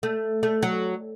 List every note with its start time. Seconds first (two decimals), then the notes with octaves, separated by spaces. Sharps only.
0.03 A3
0.43 A3
0.63 F#3